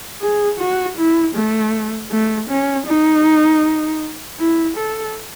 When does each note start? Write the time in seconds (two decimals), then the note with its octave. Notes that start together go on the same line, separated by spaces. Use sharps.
0.21 G#4
0.60 F#4
0.98 E4
1.36 A3
2.11 A3
2.50 C#4
2.87 D#4
4.40 E4
4.77 A4